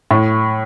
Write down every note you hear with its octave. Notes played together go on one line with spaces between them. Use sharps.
A2